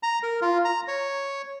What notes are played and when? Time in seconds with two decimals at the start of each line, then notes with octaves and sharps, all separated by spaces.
0.03 A#5
0.23 A#4
0.42 F4
0.65 A#5
0.88 C#5